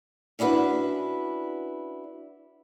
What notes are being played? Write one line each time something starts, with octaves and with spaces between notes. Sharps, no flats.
C#4 D4 E4 F#4 B4